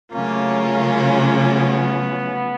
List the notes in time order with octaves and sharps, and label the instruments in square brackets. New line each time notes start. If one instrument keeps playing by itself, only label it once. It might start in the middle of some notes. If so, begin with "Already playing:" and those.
[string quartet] C#3 F#3 A3 C#4 F4 [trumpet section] A#3
[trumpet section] B3